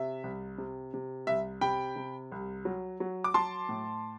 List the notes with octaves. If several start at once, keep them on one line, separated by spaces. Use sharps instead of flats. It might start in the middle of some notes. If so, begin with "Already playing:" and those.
Already playing: C3 E5
C2
C3
C3
C2 E5
C3 G5 B5
C3
C2
F#3
F#3
D6
F#3 A5 C6
A2